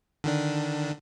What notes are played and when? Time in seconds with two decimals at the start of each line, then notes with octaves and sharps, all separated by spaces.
0.24 D3 D#3 D4